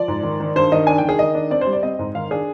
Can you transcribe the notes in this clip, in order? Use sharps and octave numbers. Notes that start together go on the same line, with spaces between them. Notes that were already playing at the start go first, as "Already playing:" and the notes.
Already playing: F3 D5
G#2
D#3
D#3
G2 C5
D#3 D#5
D4 G#5
D#3 G5
G#4
D#3 D#5
D4
C4 D5
C5
G3
D5
C4 D#5
G#2
D#3 F5
D4 G#4